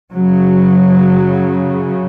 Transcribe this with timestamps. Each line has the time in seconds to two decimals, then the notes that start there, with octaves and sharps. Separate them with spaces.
0.14 F#2 C#3 F#3